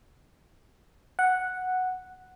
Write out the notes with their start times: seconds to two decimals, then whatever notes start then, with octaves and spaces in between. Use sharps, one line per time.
1.19 F#5